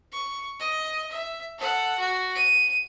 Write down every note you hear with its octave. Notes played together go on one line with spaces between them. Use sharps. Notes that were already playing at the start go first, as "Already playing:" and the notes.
C#6
D#5
E5
A4 F#5
F#4
D#7